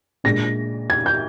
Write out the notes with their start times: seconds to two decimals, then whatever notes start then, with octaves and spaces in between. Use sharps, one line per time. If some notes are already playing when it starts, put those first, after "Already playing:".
0.24 A#2 G#3 D4 A#6
0.90 G#6
1.06 G6